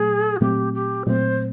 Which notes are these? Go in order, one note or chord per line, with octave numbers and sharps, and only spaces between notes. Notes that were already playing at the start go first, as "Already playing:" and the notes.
Already playing: A#2 F#3 A3 G#4
F#4
A#2 F#3 A3 C4 G4
G4
A#2 F#3 A3 C4 C5